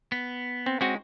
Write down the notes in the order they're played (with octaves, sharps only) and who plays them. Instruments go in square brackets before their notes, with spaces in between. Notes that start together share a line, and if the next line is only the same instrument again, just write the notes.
[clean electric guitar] B3
[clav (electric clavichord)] C4
[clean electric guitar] G#3 C#4 [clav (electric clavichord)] C4 F#4